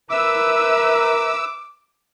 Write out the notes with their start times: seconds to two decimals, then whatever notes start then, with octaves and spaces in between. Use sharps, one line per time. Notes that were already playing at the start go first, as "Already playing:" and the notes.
0.11 A#4 B4 E5 D6 E6